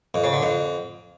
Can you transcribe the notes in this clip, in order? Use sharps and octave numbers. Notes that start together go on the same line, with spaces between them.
F2
C#3
D3
F2